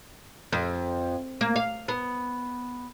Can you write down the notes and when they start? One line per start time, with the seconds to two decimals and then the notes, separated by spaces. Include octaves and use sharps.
0.52 F2
1.41 A#3
1.56 F5
1.88 B3